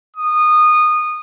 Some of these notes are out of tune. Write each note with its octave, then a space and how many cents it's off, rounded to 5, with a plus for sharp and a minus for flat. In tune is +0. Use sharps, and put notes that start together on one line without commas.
D#6 -20